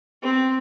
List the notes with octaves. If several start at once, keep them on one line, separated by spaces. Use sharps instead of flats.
C4